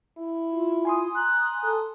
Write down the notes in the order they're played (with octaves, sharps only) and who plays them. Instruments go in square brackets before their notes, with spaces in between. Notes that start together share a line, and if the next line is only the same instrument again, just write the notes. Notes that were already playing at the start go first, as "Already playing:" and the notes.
[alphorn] E4
[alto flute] F4
[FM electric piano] G#5 C6 D#6
[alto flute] A#5 [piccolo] F#6
[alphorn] A4